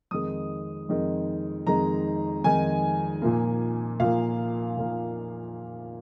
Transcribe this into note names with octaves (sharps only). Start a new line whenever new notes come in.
F2 D#3 G#3 D#6
F2 D#3 G#3
F2 D#3 G#3 A#5
F2 D#3 G#3 G#5
A#2 F3 A#3
A#2 F3 A#3 F5
A#2 F3 A#3